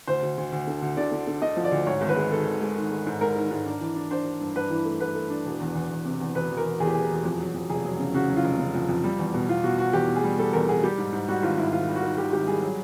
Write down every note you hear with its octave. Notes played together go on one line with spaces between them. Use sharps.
D2 C5
D2
D2
D2
D3
D2
D3 D5
D3
D3
D3 D#5
F3
D5
D2
G#2 C#5
G#1
B4
G#3
D#3 A4
G#1
G#3
D#3
G#3
G#2
G#2 A#4
D#3
G#2
D4
E3
D4
D4 C5
D4
G2
G2 B4
E3
A3
A3 B4
A3
D4
E1
E2
E2
E2
C3
E2
E1 B4
E1
A#4
E1
E2 G#4
G4
E1 G#4
E1
F2
F#3
F2
F1 G#4
F#3
C#3
C#3 F#4
F#3
F4
F1
C#3
F2
F2
G3
E2
B2
B2 F4
B2 F#4
B2 F#4
E2 G4
B2
G#4
G3
G3 A4
E2 A#4
B2 G#4
G3 G4
G#2
G#2
G3 F#4
G#1 F4
G#2 E4
D#3 F4
G3
F#4
D#3
D#3 G4
G#1 G4
G3 G#4
F#3